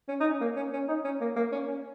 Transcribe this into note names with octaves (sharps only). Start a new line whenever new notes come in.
C#4
D#4
C#4
A#3
C#4
C#4
D#4
C#4
A#3
A#3
C#4
C#4